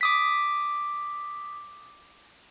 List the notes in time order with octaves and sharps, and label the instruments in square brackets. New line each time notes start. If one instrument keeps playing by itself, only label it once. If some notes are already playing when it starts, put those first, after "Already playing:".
[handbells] D6 D#6 B6